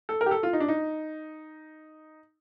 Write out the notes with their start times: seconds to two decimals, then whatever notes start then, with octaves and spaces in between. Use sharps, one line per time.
0.09 A4
0.21 A#4
0.26 G4
0.31 A4
0.43 F4
0.53 D#4
0.60 D4
0.68 D#4